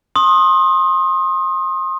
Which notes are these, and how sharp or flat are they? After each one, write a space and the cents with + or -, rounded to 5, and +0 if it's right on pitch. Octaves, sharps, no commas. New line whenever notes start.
C6 +30 D#6 +0